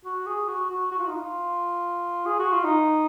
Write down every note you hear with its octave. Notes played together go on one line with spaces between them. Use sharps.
F#4
G#4
F#4
F#4
F#4
F4
D#4
F4
G#4
F#4
F4
D#4